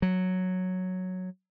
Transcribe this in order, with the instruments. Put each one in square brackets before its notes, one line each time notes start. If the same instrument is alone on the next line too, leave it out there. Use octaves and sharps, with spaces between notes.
[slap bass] F#3